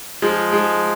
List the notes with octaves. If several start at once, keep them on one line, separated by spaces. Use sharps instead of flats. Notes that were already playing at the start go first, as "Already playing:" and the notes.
F3 G#3
F3 G#3